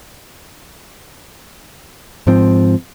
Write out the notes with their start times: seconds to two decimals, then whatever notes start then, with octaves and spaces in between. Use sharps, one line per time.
2.27 G#2 F3 C4